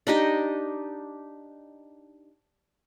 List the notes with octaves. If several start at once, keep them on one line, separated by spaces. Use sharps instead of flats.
D4 D#4 G4 D#5